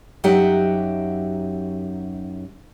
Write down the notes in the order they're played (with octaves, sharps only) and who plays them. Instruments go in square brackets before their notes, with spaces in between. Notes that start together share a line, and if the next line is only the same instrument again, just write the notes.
[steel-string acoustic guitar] F#2 F#3 D#4 G4 E5 F#5